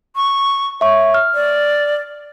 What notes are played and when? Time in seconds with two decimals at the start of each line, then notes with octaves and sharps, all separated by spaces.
0.16 C#6
0.81 C#5 E5 C#6
1.14 F6
1.35 D5